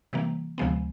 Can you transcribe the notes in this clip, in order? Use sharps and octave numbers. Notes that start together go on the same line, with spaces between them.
C3 E3 G3 A#3
D2 C3 F3 G#3 B3